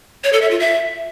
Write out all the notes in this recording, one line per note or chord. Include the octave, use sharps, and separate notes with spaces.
C#5
A4
E5
F4
E5